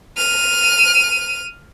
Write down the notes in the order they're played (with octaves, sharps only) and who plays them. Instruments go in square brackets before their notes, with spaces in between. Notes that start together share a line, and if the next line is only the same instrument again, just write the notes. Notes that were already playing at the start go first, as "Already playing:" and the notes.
[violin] F6 D#7